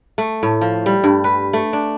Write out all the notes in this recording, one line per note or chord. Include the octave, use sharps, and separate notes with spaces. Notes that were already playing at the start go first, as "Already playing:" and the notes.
A3
A2
F3
G3
G2
B4
A3
D4